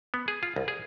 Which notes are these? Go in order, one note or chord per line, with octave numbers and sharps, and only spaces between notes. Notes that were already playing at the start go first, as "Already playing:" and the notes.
B3
G#4
F4
C2
G#4